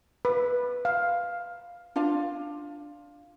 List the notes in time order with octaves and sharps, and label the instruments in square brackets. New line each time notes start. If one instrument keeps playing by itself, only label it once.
[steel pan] B4
F5
[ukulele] D4 F4 F5